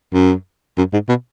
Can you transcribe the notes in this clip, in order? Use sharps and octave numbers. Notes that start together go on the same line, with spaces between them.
F#2
F#2
G#2
B2